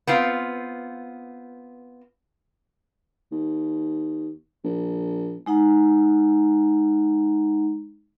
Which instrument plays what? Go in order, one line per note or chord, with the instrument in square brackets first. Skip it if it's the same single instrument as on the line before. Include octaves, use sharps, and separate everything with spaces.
[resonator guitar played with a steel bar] B3 C4 F4
[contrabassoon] D#2
A#1
[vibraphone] G#3 D#4 F#5 A#5